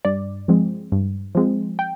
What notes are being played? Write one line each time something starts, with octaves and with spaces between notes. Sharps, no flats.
G2 D5
F3 G#3 C4
G2
F3 G#3 C4
G5